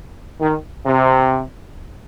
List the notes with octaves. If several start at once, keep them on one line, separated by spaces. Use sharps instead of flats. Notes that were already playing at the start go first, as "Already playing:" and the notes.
D#3
C3